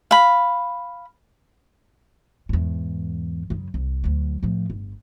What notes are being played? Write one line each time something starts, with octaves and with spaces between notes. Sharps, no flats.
F5 B5
E2 G#2
F#2 C#3
C2
D2 F#3
A2 F3
G1